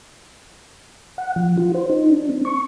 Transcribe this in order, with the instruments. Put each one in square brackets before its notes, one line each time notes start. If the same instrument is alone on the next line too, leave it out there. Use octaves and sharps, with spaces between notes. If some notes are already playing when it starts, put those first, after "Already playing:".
[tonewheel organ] F#5
F3
F4
C5
D#4
D4
C4
C#6